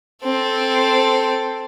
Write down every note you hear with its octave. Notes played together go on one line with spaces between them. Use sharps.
C4 A4